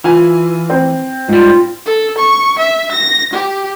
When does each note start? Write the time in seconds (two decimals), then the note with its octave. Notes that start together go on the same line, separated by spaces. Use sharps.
0.04 E3 F4 G#5
0.70 C4
1.29 G#2 G3 F4
1.86 A4
2.18 C#6
2.58 E5
2.92 A#6
3.33 G4